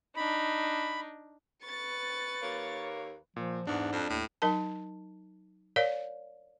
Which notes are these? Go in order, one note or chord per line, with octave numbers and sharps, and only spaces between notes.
D4 D#4 B5
B4 C#6 A6
D#2 A#3 C#5
A#2 F3
E2 G#2 D4
F2
D#2 A2
F#3 D#4 A#4 A5
A#4 C#5 D5 F5